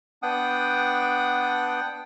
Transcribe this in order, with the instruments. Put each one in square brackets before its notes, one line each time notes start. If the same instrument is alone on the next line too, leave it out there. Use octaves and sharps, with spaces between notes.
[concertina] B3 D4 F#5 G5 D#6